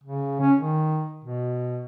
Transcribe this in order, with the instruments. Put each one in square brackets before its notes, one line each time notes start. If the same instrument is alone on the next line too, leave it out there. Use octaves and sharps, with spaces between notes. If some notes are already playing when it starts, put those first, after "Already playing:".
[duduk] C#3
C#4
D#3
B2